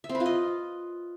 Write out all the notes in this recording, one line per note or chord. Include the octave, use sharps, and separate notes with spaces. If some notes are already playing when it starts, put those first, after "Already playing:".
E5
C4
B4
F4
D#5